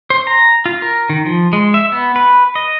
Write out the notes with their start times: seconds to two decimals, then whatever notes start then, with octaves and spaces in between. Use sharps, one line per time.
0.10 C5
0.27 A#5
0.66 F4
0.82 A#4
1.10 D#3
1.26 F3
1.53 G#3
1.74 E5
1.92 B3
2.16 B4
2.55 D#5